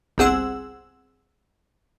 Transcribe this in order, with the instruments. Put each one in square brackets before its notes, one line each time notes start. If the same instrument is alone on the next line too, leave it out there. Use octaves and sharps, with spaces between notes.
[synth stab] G1 C2 C4 G#4 F#5 E6